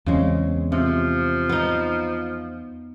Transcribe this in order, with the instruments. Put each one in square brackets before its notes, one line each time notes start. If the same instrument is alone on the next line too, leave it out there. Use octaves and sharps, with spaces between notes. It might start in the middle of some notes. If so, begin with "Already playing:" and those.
[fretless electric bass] E2 C4 [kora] C#3 G#3
[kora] C3 [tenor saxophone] F3
[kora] B3 D#4